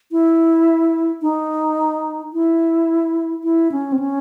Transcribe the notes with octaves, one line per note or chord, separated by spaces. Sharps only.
E4
D#4
E4
E4
C#4
C4
C#4